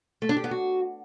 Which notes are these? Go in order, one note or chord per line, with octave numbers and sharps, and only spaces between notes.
A3
D4
G4
B3
F#4